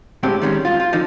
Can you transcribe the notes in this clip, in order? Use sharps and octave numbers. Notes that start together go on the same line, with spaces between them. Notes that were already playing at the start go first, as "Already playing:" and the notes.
A2 D3 G#3 C4 G4
D#3 G3 G#3 C#4
F4
F4
D3 F3 D#4